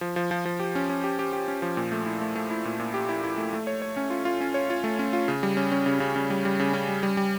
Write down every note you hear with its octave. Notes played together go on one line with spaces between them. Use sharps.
F3
F3
F3
F3
G4
C#4
C#4
G4
G4
G4
C#4
F3
A#2
A3
E4
A3
A3
E4
A#2
A#2
G4
E4
E4
A3
A3
C#5
C#5
C#4
F4
F4
C#4
C#5
F4
A3
C#4
F4
C#3
G3
C#4
C#4
C#3
C#3
C#3
G3
G3
C#3
C#4
G3
G3
G3